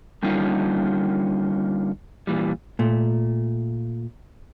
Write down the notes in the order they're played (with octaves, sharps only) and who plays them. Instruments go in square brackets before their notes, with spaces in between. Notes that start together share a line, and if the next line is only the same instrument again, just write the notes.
[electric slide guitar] D3 G3 A#3 C#4 D#4 F4
A#2 E3 G3
[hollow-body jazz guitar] A#2 A3